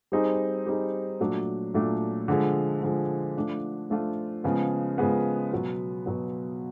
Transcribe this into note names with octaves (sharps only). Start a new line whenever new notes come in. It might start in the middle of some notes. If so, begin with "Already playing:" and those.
G3 C4 D#4 G#4
G3 C4 D#4 G#4
A#2 F#3 A3 D4
A#2 F#3 A3 D4
D3 F3 G#3
D3 F3 G#3
F3 A3 D4 F4
F3 A3 D4 F4
C#3 F3 G#3 B3
C#3 F3 G#3 B3
B2 F#3 B3
B2 F#3 B3